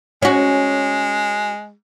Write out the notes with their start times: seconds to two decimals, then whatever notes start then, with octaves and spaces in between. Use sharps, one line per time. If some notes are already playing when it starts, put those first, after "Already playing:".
0.22 G#3 C#4 F#4